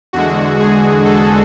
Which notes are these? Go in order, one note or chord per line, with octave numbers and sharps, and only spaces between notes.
E2 D3 G#3 F#4
G#4
A4